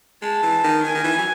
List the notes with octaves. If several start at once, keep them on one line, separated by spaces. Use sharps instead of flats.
G#3 A5
E3
D#3
D#3 G#5
D#3
E3
F#3